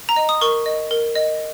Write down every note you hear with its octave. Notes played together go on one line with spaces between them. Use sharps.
A#5
D#5
D#6
A#4 C#6
D#5
A#4
D#5